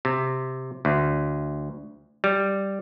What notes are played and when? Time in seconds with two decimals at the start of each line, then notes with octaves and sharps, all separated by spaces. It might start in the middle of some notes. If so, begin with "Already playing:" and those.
0.05 C3
0.85 D2
2.24 G3